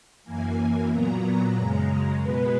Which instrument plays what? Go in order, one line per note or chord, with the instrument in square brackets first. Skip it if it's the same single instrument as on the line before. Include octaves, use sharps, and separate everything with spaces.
[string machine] F#2 E3 A#3 G#5
A#2 F#3 B3 A#5
F#2 C#3 G#3
B2 G#3 B3 B4